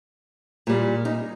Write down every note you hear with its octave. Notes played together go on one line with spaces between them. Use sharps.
A#2 G3
D#4